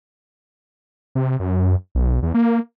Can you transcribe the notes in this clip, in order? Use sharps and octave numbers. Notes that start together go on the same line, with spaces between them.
C3
F#2
B1
E2
A#3